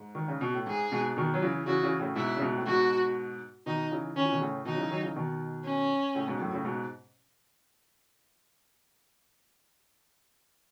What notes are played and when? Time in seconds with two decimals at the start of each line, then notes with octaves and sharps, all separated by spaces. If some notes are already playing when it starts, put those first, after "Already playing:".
Already playing: G#2
0.15 D#3
0.28 C#3
0.41 B2
0.54 A2
0.67 G#2 G#4
0.92 G#2 B2
1.17 B2 D#3
1.34 F#3
1.42 C#3 E3
1.66 C#3 E3 F#4
1.83 C#3 E3
2.00 A2 C#3
2.16 G#2 B2 E4
2.37 C#3
2.41 G#2 B2
2.56 A2
2.67 G#2 B2 F#4
3.66 B2 D#3 D#4
3.91 C#3 E3
4.16 D#3 C#4
4.24 E3
4.31 B2 D#3
4.41 A2 C#3
4.65 B2 D#3 D#4
4.74 F#3
4.78 C#3 E3
4.91 D#3 F#3
5.03 C#3 E3
5.16 B2 D#3
5.65 C#4
6.15 A2 C#3
6.28 G#2 B2
6.40 F#2 A2
6.52 A2 C#3
6.65 G#2 B2